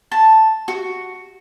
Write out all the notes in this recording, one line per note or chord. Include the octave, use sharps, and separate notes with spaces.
A5
F#4